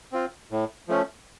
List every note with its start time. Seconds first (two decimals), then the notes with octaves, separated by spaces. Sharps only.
0.12 C4 F4
0.51 A2
0.88 F3 A3 C#4